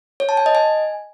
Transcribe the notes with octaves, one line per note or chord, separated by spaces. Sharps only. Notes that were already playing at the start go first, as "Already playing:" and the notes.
C#5
A5
G#5
D#5
G#5